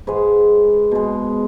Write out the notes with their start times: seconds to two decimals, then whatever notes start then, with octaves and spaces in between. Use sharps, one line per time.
0.07 G#2 G#3 B4
0.91 B2 G#3